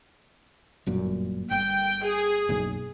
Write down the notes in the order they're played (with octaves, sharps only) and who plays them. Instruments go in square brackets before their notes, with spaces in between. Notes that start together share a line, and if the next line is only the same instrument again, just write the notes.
[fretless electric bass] G1 F#2 A#2
[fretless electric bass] G1 [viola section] G5
[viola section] G#4
[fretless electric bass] F#1 B1